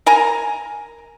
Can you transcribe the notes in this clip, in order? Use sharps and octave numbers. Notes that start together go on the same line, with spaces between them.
A#4 G#5 A#5